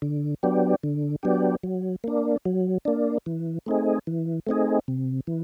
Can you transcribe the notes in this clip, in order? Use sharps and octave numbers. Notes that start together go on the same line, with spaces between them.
D3
F#3 B3 D4 G4
D3
F#3 B3 D4 G4
F#3
A#3 D4
F#3
A#3 D4
E3
A3 C4 D#4 G#4
E3
A3 C4 D#4 G#4
C3
E3